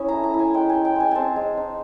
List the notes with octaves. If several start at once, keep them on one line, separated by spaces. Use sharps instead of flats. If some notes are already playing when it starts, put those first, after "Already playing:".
Already playing: C#4 E4 D#6
A3 A#5
A#5
E4
G#5
G#3 G5
G#5
D#4
G5
G#3 G#5
C4 G#5 A5
G#3
D#4